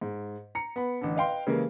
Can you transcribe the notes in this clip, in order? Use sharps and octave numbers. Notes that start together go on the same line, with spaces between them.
G#2
A#5 C#7
B3 B5
A1 D3
B4 D#5 F5 G5 C6
C#3 E3 G#3 A#3 G4 A#4